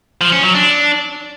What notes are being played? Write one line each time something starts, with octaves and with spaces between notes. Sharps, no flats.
F3
C#4
F#3
D4